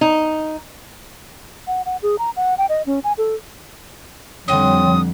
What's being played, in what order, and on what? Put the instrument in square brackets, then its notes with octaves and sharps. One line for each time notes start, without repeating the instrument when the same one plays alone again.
[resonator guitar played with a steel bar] D#4
[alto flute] F#5
F#5
G#4
A#5
F#5
G5
D#5
C#4
G#5
A4
[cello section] F2 [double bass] D3 G3 [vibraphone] C#5 G5 C6 [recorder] D#6